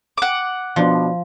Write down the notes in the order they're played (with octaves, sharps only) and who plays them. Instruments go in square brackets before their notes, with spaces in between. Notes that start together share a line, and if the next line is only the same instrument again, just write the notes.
[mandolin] F#5 D6
[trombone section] B2 B3 D4 [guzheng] F3